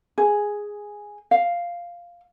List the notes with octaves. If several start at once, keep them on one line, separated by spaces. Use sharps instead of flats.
G#4
F5